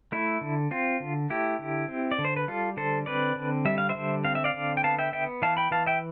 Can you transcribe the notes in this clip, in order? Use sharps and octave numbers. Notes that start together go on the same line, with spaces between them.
A3 E4
D3
C4 F4
D3
A3 E4 G4
D3
C4
D5
D3
C5
B4
G3 F4 A4
D3 A4 C5
C4 B4 D5
D3
G3 E5
F5
C5 E5
D3
C4 F5
E5
D5 F5
D3
G5
B3 F5 A5
E5 G5
B3 E5 G5
E3 F5 A5
G5 B5
E3 F5 A5
E5 G5